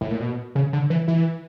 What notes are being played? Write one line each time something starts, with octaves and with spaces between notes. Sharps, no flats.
A2
A#2
B2
C#3
D3
E3
E3